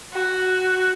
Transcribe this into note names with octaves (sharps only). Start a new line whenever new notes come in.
F#4